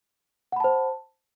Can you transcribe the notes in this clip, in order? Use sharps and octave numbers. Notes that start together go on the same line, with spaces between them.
C5 F#5 A5 B5